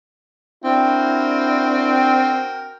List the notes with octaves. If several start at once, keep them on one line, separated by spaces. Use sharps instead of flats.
C4 D4 E4 F#4 A#4 G5